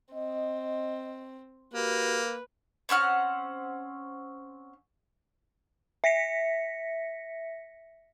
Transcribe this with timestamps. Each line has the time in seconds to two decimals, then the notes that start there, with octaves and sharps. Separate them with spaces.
0.14 C4 D#5
1.74 A#3 F#4 G4 B4
2.89 C4 C#4 F#5 F6
6.04 E5 A#6 B6 C#7